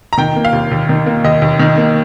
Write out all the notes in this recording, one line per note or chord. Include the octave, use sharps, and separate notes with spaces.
A#5
D#3 G5
A#3
F5
D#2
D#2
D#3
A#3
D#2 D#5
D#2
D#3
A#3